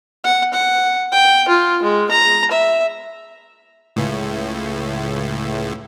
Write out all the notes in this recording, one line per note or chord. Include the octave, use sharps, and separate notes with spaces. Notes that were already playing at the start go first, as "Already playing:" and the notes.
F#5
F#5
G5
F4
G#3
A#5
E5
C#2 A2